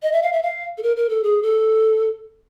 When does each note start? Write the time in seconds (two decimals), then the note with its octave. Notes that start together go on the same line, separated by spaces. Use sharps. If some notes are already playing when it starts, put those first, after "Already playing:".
0.03 D#5
0.12 E5
0.22 F5
0.33 E5
0.43 F5
0.78 A4
0.83 A#4
0.97 A#4
1.09 A4
1.23 G#4
1.43 A4